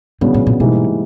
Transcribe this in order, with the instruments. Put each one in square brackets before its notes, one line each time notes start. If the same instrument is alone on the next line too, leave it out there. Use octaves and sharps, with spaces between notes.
[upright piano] E2 C#3 F#3 B3 D4 [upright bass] G#2
[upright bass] A2
A#2
[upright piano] G#2 E3 G3 A#3 D#4 [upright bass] B2